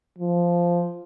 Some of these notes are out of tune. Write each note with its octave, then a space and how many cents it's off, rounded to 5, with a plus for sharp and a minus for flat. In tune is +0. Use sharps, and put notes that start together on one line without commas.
F3 -5